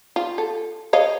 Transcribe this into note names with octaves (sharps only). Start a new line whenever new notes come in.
F4
A4
C#5 D#5 F5